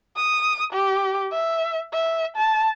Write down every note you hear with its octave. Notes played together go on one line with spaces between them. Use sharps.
D#6
G4
E5
E5
A5